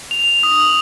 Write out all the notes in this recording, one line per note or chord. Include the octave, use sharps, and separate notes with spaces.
F7
D#6
F#7